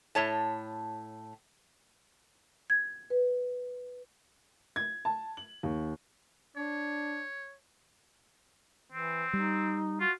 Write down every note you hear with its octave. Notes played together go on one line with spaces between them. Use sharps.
A2 C#5 A5
G#6
B4
G#6
A5
F#7
D#2
D4 C#5
E3 C4
G3 D#4
F4 F#4